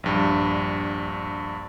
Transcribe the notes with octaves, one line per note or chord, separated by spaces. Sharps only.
A#1 G2